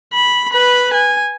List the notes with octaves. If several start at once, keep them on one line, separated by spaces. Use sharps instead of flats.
B5
B4 B5
G#5